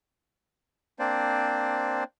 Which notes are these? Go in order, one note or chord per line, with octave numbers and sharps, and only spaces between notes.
A#3 C4 D4 C5 D5